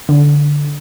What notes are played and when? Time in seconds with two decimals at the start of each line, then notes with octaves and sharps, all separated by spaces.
0.09 D3